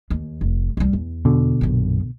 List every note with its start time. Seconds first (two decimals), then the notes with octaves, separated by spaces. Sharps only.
0.10 D#2
0.41 F1
0.77 C2 G3
0.93 E2
1.25 B2 D3
1.61 A#1 F#2